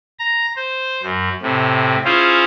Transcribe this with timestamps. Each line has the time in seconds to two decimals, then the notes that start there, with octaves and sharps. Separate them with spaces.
0.19 A#5
0.56 C5
1.03 F#2
1.42 A2 C3
2.05 C#4 E4 F4 G#4 C5